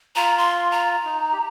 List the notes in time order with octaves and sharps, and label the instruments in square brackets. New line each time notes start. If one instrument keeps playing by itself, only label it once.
[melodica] F4 [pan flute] A#5
[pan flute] C6
A#5
[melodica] D#4
G4